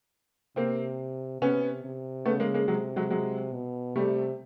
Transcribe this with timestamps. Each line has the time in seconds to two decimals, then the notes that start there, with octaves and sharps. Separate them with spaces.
0.56 C3 A#3 C4
1.41 C3 B3 C#4
1.84 C3
2.25 C#3 A3 B3
2.40 G#3 A#3
2.54 G#3 A#3
2.68 C3 F#3 G#3
2.96 F#3 G#3
3.10 F#3 G#3
3.53 B2
3.95 C3 G3 A3